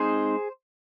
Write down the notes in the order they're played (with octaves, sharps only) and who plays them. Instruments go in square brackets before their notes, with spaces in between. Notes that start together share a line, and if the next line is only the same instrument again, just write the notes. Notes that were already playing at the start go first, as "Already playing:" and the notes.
Already playing: [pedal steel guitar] G#3 C4 D#4 G#4 C5